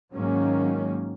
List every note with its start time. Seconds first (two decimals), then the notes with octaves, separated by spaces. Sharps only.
0.13 G#2 D#3 F#3 A#3 C#4